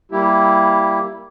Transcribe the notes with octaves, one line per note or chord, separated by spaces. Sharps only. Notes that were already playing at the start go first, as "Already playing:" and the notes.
G3 A#3 E4 G4